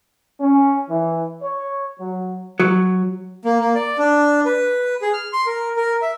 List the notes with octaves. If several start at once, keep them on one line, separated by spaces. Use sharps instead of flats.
C#4
E3
C#5
F#3
F#3
A#3
A#3
D5
D4
B4
G#4
F6
C6
A#4
A#4
E5